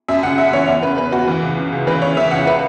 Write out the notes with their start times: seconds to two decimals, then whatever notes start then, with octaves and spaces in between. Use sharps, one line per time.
0.08 F#2 E5
0.23 C#3 F#5
0.38 F#2 E5
0.53 E3 C#5
0.68 E2 C#5
0.83 C#3 B4
0.98 E2 B4
1.12 E2 F#4
1.27 E3
1.43 C#2
1.57 C#3
1.72 C#2
1.87 E3 B4
2.02 C#3 C#5
2.17 E3 E5
2.31 C#2 F#5
2.47 B4